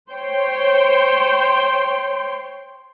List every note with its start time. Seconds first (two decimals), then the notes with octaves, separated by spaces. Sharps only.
0.10 C5 C#5 G5 C6